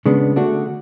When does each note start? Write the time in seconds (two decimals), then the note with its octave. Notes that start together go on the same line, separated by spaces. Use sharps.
0.06 C#3 G#3 B3 D4
0.36 D3 A3 D4 F#4